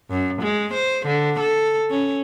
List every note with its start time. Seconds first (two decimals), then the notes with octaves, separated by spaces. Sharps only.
0.10 F#2
0.42 G#3
0.74 C5
1.06 D3
1.40 A4
1.90 C#4